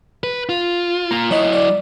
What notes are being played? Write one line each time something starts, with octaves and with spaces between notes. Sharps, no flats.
B4
F4
A#3 F4 A#5
F#3 E4 C#5 D#5
D5